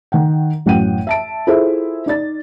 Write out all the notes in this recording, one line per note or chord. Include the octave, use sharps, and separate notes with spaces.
D#3 F#5 G5
A1 F#2 F#5 G5 D#7
E5 A5 D7
E4 F4 G#4 A4 C5 E5
D#4 D5 A6